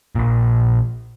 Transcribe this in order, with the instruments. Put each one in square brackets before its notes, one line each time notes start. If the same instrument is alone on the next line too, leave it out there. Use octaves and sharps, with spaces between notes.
[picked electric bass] A#1 A#2